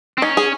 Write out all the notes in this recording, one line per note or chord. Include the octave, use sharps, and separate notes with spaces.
C4
C#4 D#4
G#4